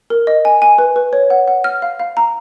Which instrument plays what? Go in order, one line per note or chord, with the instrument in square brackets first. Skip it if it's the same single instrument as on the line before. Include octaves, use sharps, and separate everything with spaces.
[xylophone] A#4
D#5
G#5
G#5
B4
B4
C#5
F#5
F#5
F6
F5
F5
A#5